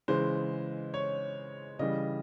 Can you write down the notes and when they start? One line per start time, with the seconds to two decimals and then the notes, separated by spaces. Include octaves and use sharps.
0.08 C#3 E3 G#3 C5
0.94 C#5
1.79 C#3 E3 G3 D#5